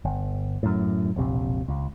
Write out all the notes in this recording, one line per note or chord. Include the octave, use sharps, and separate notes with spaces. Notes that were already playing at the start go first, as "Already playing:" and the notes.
G1
F#2 A2
E1 A#1 C3
C#2